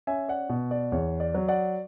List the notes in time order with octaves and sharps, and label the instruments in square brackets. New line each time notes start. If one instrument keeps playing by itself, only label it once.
[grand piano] C#4 E5 G#5
D5 F#5
B2
D5
E2 C#5
D5
F#3
D5 F#5